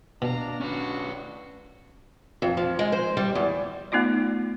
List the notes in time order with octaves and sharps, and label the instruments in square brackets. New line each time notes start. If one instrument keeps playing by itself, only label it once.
[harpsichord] B2 [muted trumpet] D4 [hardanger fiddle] F5 A#5
[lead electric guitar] C#4 B4 [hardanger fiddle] F#4
[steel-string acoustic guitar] F2
F3
G#3
C5
G3
E2
[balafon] A3 B3 D#4 F4 D5